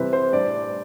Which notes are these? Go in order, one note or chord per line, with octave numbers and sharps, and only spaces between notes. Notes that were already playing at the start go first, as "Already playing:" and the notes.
Already playing: C3 E3 G3 C4 B4
C5
A2 G3 D4 D5